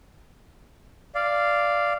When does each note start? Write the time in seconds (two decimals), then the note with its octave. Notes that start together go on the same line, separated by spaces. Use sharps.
1.15 D5 F5